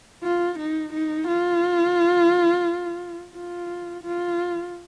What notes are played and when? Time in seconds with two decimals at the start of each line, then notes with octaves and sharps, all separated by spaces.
0.23 F4
0.59 D#4
0.93 D#4
1.27 F4
3.34 F4
4.03 F4